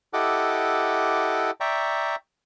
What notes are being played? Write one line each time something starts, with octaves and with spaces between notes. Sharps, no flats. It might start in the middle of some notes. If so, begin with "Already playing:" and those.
E4 G4 A4 D#5 F#5 D6
D5 E5 G5 A#5 C#6